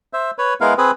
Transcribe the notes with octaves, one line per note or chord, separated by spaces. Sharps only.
C5 E5
B4 C#5
G#3 B3 E4 A#4 F5
C4 G#4 B4